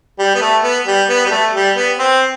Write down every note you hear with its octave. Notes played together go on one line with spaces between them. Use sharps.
G3
B3
A3
B3
G3
B3
G3
A3
G3
B3
C4